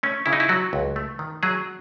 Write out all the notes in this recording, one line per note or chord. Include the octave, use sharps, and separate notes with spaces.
A3 C#4
C#3 E4
D#4
E4
F#3 F#4
C#2
A3
D#3
F#3 G#4